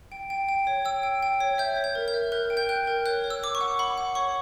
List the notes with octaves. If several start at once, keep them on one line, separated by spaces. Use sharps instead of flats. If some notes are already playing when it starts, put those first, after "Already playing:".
G5
G5
G5
C#5
G5 E6
G5
G5
C#5
E5 G6
C#5
G6
A#4
G6
E5
A#4 F#6
G5
G6
G5 F#6
A#4
C#5 F#6
C#5
E6
C#5 D6
C#6
F#5
F#5 B5
F#5
C#5 C#6